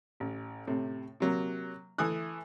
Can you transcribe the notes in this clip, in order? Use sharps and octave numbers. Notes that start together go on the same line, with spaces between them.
A1
A2 C3
C3 F#3 A#3
E3 A3 G#5 D#6 F#6